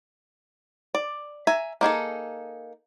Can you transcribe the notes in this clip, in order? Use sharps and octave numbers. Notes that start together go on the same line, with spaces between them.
D5
E5 G#5 A#5
A#3 D#4 G#4 A4